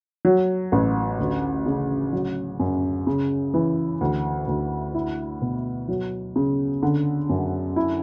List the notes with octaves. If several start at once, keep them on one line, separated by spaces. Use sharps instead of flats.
F#3
A1
D2
C#3
F#3
F#2
C#3
E3
D2
D2
E4
B2
F#3
C#3
D3
F#2
E4